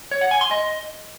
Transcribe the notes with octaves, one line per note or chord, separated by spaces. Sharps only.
C#5
F#5
G#5
C6
D#5